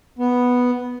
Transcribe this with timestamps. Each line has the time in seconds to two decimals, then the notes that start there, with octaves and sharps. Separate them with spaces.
0.19 B3